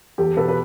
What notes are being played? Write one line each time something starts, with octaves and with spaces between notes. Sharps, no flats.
E2 G4 A4
B2 A4 B4
B4